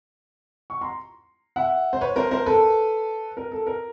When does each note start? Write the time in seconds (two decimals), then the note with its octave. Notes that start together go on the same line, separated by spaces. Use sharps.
0.70 C#6
0.81 A#5 C6
1.56 E5 F#5
1.93 C5
2.01 B4 C#5
2.16 A#4 C5
2.31 A#4 C5
2.46 A4 B4
3.37 A#4
3.52 A4
3.67 A#4